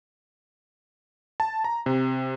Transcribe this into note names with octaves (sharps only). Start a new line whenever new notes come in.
A5
A#5
C3